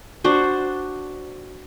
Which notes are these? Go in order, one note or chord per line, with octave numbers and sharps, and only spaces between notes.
D4 F#4 C5